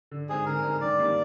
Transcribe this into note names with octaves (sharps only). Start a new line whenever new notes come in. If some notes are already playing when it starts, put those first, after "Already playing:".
D3
G#3 C4 D#4 G#4
D3 A#4
G#3 C4 D#4
D#3 D5
G3 A#3 D#4